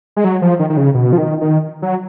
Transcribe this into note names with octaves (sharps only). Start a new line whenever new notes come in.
G#3
F#3
F3
D#3
D#3
C#3
B2
F3
D#3
D#3
F#3